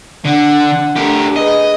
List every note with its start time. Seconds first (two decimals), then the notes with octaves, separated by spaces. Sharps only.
0.25 D3 D4 F#5
0.96 A3 D4 G4 A#4
1.36 G#4 B4 D#5